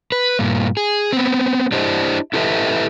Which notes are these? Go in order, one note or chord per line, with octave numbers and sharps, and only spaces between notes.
B4
G2 A#2
G#4
B3 C4
D4 E4 G4 C5 D#5
E4 G4 A4 B4 D#5 E5